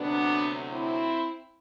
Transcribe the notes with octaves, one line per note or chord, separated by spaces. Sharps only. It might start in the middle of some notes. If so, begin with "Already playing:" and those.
Already playing: D2 C3 F#3 B3 D4
C4 E4